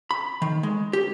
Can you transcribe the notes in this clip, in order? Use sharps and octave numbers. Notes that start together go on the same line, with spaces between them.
B5
D#3
G#3
G4